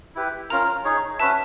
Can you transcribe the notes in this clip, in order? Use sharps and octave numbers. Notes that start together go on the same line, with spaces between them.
E4 G4 B4
C#4 F4 A#4 A#5
D#4 G#4 C#5
C#4 F#4 B4 E5 A5